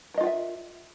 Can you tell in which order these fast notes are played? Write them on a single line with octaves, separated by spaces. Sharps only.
A#4 D#5 F4 G5 E5